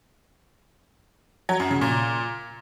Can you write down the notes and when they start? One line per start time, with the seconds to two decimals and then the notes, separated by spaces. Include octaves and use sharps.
1.49 F#3
1.60 F#2
1.71 C#3
1.81 A#2